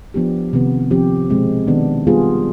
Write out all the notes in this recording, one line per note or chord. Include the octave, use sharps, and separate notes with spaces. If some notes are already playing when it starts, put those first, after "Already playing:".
F3 B3 D4 G4
C3 D#3 B3
F3 C4 G4
B2 G#3 C4
D#3 B3 D4
G3 B3 F4 G#4